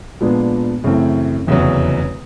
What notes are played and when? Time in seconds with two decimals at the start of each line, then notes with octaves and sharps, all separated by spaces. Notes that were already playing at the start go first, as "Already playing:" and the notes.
0.20 A#2 F3 G#3 B3 D4
0.84 F#2 C#3 E3 A3 C4
1.47 F1 E2 C#3 F#3